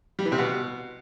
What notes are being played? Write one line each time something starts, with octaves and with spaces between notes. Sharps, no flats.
G3
E3
C3
B2